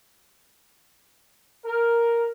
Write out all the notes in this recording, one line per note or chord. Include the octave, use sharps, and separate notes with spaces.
A#4